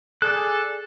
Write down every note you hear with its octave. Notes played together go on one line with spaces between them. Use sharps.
G#4 A4 D5 F#6